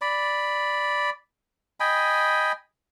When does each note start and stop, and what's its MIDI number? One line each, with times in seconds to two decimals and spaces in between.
0.01 1.10 74
0.01 1.10 83
1.80 2.52 75
1.80 2.52 79
1.80 2.52 80
1.80 2.52 83